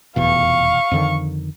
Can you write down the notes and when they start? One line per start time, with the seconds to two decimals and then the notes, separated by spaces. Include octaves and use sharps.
0.16 F1 E2 B2 F5 C#6
0.91 F2 D3 D#3